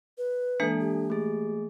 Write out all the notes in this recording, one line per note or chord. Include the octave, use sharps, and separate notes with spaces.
B4
E3 G#3 A#3 D4 A4
G4
A3 G#4